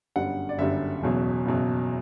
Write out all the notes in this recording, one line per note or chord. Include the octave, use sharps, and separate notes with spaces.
G1 F#2 D3 G3 F#5
D5
G1 F#2 D3 G3 E5
F#1 E2 B2 F#3
F#1 E2 B2 F#3